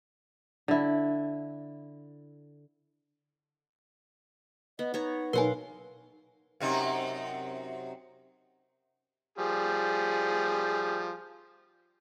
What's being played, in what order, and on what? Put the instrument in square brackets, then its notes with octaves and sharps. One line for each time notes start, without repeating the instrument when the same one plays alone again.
[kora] D3 E4
[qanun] B3 [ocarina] D#5
[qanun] B3 C#5 A#5 [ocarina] D#4
[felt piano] B1 B4 [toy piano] A#4 C#5 G#5 [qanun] F5 F#5 C6
[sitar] F#2 C3 D#4
[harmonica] F3 G3 G#4